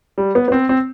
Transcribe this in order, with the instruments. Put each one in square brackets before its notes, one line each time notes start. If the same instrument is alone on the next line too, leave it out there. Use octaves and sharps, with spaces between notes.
[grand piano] G3
B3
B3
C4
C4